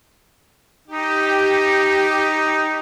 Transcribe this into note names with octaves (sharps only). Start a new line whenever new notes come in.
D#4 G4